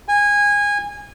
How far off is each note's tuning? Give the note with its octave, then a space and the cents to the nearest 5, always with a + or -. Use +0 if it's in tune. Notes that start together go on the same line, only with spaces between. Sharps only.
G#5 -20